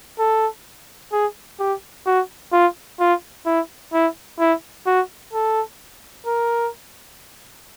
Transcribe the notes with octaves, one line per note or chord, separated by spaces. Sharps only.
A4
G#4
G4
F#4
F4
F4
E4
E4
E4
F#4
A4
A#4